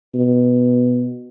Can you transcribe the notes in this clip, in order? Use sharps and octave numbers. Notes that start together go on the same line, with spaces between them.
B2